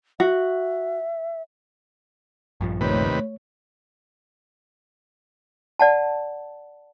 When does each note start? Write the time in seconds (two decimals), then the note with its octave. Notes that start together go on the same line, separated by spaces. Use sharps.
0.20 F#4 E5
2.61 A#1 G2 F3
2.81 D#2 C3 A3 B4 C#5
5.79 D5 F#5 A5